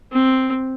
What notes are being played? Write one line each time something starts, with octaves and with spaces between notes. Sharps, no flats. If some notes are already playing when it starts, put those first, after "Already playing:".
C4